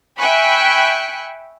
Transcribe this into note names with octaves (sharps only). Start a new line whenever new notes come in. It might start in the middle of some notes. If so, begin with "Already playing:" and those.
E5 G5 G#5 B5 C#6 F#6